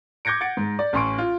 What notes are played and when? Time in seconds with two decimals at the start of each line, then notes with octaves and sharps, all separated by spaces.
0.25 D6 G6 G#6 A#6 C#7 D7
0.41 F#5 A6 C#7 D7
0.57 G#2
0.79 D5
0.93 A1 C#4 C6 C#6 D7
1.18 F4